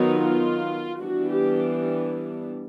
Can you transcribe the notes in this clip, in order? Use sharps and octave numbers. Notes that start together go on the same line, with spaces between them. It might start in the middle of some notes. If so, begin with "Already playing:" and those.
Already playing: D#3 F#3 B3 D#4
F4
E3 G3 B3 D4 F#4
G4